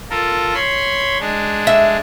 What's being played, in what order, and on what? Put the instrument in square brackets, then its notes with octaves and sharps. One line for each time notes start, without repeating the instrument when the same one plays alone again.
[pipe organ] F4 A4 A#4
C#5 B5 C6
G#3 D4
[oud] E5